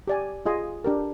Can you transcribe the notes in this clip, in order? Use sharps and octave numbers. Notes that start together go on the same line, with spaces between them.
G4 D5 G#5
F4 G#4 D#5 G#5 C6
D4 G4 A#4